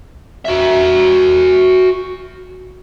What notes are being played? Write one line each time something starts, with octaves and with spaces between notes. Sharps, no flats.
F#4 E5